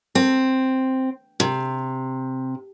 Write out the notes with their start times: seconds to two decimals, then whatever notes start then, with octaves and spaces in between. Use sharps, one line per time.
0.15 C4
1.40 C3